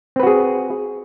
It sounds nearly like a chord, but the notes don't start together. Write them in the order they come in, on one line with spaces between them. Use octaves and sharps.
C4 B4 F#4 G#4